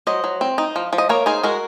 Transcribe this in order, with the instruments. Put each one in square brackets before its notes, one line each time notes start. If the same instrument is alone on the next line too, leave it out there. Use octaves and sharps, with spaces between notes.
[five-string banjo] F#3 C5 D#5
F#3
C4
D#4
F3
F3
D#5
A#3 A#4 C#5
D#4 G#4 C5
G#3 F#4 A#4